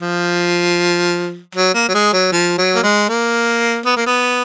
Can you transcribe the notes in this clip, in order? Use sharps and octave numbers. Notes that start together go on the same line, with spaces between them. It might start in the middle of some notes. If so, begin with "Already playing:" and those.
F3
F#3
A#3
F#3
G#3
F#3
F3
F#3
A#3
G#3
A#3
B3
A#3
B3